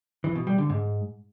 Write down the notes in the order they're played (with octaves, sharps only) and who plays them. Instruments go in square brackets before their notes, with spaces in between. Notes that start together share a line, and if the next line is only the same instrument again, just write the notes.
[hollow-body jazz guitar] E3
B2
G3
D3
G#2